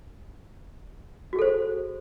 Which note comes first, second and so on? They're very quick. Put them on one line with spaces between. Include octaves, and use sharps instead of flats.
F#4 G#4 A4 C5